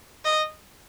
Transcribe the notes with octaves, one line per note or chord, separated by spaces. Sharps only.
D#5